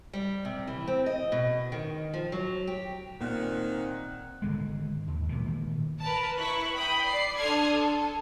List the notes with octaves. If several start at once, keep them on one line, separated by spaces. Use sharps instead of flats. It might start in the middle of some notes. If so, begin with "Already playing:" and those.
G3
C3
E3
C4
D#5
B2
D#3
F3
F#3
G4
A#2 D#3 C4 F#5
G#1 D3 G#3
D#2
G#1 A#2 D#3 E3
A#4 B4 A5
E4 B4 C#6 F#6
G5 B5 D#6
D5 C7
D4 A4 C6 D#6 F6 G#6
A4